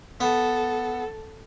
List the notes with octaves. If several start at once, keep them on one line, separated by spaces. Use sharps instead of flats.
B3 A4